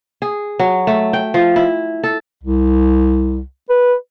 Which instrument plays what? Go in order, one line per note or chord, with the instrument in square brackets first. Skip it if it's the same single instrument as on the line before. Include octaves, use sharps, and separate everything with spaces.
[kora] G#4
F#3
A3
G5
F3
E4
A4
[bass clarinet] C2
B4